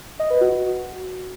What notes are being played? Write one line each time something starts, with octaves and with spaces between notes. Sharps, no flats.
D#5
B4
F#4